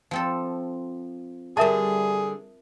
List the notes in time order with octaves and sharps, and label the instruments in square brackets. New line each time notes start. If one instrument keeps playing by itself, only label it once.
[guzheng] F3 C4 A4
[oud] D3 G3 [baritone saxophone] G#4 [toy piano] A#4 E5 A5